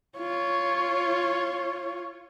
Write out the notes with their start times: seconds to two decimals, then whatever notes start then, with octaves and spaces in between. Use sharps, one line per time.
0.18 F4 C#5